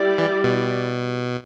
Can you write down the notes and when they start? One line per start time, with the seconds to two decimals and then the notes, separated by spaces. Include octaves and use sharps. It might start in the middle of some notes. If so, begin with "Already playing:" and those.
Already playing: G3 E4 G4 D5
0.18 E3
0.44 B2